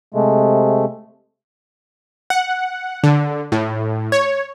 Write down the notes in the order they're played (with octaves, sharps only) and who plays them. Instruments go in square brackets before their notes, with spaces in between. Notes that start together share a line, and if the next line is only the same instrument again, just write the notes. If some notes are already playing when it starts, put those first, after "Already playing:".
[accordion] C3 G#3 A3
[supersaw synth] F#5
D3
A2
C#5